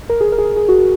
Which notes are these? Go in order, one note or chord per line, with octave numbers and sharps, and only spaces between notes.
A#4
G#4
A#4
G#4
A#4
G#4
F#4
F#4